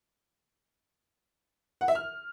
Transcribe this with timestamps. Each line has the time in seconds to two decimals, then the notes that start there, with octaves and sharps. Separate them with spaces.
1.81 F#5
1.88 E5
1.95 F6